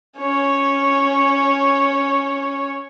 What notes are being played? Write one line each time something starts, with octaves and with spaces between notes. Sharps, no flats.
C#4 C#5